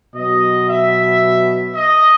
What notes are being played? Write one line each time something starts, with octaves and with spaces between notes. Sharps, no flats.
B2 F#3 D#5
E5
D#5